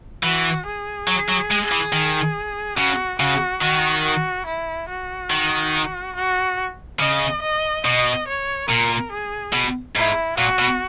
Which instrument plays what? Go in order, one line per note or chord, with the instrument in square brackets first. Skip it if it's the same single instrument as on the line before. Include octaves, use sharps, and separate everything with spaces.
[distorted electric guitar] E3 [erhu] F#4
[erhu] G#4
[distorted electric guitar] F#3
F#3
G#3
E3
D#3
[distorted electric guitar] C#3 [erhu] F#4
[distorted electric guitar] C#3 [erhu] F#4
[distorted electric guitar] D#3 [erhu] F#4
[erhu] F#4
E4
F#4
[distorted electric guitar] D#3
[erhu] F#4
[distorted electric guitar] C#3 [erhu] D#5
[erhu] D#5
[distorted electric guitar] B2 [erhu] D#5
[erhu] C#5
[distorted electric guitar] A#2 [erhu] A#4
[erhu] G#4
[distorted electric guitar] B2
[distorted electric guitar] G#2 [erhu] E4
[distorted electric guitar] A#2 [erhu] F#4
[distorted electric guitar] B2